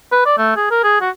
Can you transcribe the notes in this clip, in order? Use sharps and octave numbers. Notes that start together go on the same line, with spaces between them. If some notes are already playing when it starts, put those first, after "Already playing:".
B4
D5
A3
G#4
A#4
G#4
F#4